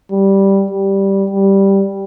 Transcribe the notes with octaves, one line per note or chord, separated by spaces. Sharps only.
G3
G3
G3